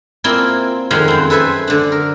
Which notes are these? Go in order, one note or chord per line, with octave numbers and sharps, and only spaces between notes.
A#3 C4 E4 F4 D5 G#5
F2 D#3 F#3 G#3 F5 C6
F#2 C4
A4 B4 C5 E5 G#5
D3 D4
A#4